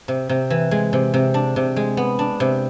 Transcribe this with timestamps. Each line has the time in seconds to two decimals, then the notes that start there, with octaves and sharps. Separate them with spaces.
0.08 C3
0.29 C3
0.50 E3
0.71 G#3
0.93 C3
1.14 C3
1.34 D4
1.56 C3
1.76 G#3
1.97 B3
2.19 D4
2.40 C3